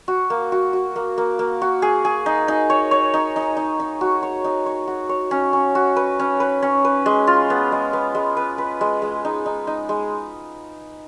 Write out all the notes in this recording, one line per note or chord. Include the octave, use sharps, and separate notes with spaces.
F#4
A#3
F#4
F#4
A#3
A#3
A#3
F#4
G#4
G#4
D#4
D#4
C#5
C#5
D#4
D#4
D#4
D#4
F#4
C#5
D#4
C#5
F#4
C#5
C#4
C#4
F#4
B4
C#4
B4
C#4
B4
G#3
F4
B3
G#3
B3
G#3
B4
B4
G#3
G#3
D#4
D#4
D#4
G#3